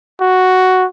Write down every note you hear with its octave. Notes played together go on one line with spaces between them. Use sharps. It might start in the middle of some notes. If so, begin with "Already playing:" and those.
F#4